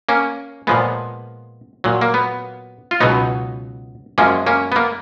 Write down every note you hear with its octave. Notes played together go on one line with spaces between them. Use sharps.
A#3 C#4
A#2 F3 G#3 B3
A#2 F#3
A#3
B3
F4
C#2 B2 F#3 B3 D#4
F#2 F3 G#3 A#3 C#4
A#3 C#4
B3
A#3